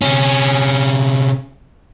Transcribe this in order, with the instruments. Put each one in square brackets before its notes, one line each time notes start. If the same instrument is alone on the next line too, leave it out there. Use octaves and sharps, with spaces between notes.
[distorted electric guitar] C3 C#4